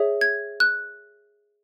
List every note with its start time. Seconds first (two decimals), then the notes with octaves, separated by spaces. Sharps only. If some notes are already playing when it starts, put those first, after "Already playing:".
Already playing: G#4 C#5 E5
0.21 G#6
0.60 F#6